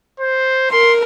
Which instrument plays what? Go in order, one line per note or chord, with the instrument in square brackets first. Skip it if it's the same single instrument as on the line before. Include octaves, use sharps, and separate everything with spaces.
[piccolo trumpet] C5
[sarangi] A#4 [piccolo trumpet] C6